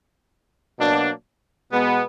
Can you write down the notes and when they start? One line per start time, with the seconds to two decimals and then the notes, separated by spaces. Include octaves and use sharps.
0.79 B2 F#3 A#3 D4
1.71 B2 G#3 B3